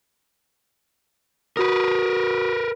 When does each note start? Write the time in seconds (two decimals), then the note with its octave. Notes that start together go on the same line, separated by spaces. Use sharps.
1.57 F#4 A#4 B4 D#6